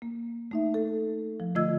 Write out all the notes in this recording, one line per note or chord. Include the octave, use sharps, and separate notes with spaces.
A#3
A3 D#4 E5
A4
F3
D3 A3 F4 D#5 E6 G#6